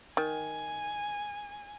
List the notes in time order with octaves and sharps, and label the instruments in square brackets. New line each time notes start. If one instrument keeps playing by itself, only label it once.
[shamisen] D#3 [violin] G#5